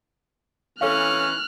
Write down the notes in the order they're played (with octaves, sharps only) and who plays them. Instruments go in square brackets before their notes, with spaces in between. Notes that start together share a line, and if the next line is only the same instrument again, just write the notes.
[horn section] E3 C#4 [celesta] A4 C#5 F5 [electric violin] F6 F#6